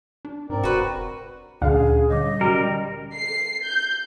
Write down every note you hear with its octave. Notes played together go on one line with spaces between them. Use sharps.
D4
G#2 C4 A#4 D5
F1 F#4 B4
D2 A#2 C#4 D4 G#4 F5
D3 G3 D#5 D6
G3 C#4 F#4 A#4
C7
G6